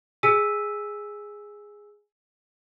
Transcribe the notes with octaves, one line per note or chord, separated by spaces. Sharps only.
G#4 G#5 E6 B6 D#7